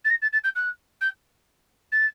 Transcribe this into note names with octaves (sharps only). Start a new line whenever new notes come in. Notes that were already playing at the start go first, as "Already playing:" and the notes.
A6
A#6
A6
A6
G6
F#6
G6
A6